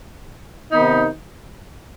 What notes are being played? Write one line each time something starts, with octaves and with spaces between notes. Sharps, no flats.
C3 D#3 B3 D#4